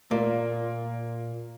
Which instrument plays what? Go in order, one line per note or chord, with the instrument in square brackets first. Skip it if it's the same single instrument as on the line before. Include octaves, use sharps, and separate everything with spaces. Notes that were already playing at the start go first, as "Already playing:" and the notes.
[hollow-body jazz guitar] A#2 [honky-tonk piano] A#3